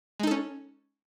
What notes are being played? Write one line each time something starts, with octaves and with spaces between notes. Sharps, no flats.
G#3 C#4 D#4 A4